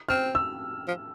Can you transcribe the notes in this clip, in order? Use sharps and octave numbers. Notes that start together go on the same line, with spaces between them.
C4 F6
E6
F3